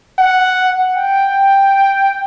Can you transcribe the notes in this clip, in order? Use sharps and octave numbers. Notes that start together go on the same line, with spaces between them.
F#5
G5